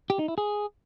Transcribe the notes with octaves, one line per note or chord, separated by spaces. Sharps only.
G4
D#4
E4
G#4